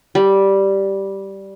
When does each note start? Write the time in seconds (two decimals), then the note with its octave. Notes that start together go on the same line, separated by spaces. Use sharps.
0.15 G3